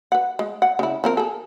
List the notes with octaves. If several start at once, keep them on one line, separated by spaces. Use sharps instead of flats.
B4 F#5
G#3
F#5
C#3 E4
F3 C4 A#4
G#4 A4